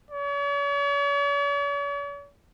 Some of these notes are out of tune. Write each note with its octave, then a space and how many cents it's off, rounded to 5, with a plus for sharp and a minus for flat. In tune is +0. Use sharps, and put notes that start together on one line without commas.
C#5 +45